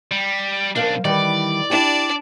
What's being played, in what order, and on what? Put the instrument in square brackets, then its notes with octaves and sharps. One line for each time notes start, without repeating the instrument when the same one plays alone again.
[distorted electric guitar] G3
[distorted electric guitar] B1 D4 [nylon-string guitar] A#4 C5 F5
[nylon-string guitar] D#3 E3 G3 [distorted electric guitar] D5
[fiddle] D4 [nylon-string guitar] E4 G4